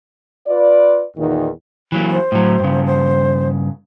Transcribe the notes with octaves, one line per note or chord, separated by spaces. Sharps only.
F4 B4 D5
E2 A#2 D#3
E3 F#3 A#3
C5
A2 F#3
G2 C#3
C5